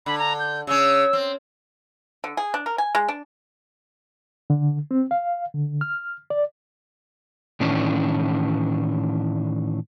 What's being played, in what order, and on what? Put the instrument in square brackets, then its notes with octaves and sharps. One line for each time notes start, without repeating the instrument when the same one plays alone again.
[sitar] D3 [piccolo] B5
[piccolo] A#5
G6
[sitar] C#3 C#4 [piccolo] E6
[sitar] C4
[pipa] D3
G#4
D4
A#4
G#5
G#3
D4
[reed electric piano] D3
C4
F5
D3
F6
D5
[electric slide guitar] A2 D#3 E3 C#4 D4